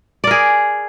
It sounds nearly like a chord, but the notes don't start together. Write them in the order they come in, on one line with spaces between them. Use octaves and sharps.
D5 A#4 G#4